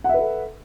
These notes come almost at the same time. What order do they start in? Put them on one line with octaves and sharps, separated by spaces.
F#5 E5 B4 A4